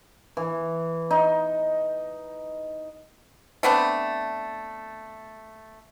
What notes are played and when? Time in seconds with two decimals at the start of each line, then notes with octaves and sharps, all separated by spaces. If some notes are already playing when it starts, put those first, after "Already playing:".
0.37 E3
1.11 D#4
3.63 A3 B3 C4 D4